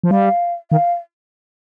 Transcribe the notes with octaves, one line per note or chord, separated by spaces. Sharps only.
F3
G3 F5
D#3 F5